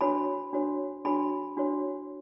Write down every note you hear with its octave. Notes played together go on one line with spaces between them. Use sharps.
D4 F#4 C#5 B5
D4 F#4 C#5
D4 F#4 C#5 B5
D4 F#4 C#5